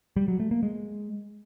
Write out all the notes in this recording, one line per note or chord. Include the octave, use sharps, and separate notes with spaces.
G3
F#3
A3
A#3
G#3